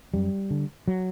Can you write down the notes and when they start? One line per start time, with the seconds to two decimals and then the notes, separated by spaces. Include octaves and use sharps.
0.14 F#2 G3
0.50 D3
0.88 F#3